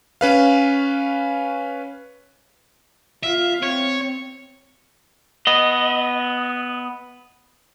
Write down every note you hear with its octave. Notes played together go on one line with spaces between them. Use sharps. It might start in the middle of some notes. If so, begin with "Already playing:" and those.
C#4 B4 F5
F4 E5 F5
C4 C#5
B3 D#5